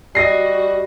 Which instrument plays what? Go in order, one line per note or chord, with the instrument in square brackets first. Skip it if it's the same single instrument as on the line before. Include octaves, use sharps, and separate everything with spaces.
[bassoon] G3 [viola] F#4 [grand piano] D#5 A#6 C7